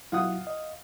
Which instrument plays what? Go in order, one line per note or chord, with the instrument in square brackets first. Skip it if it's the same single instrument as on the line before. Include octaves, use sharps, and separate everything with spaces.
[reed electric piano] F#3 E4 [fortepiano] F4 F#5 D#6
[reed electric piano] D#5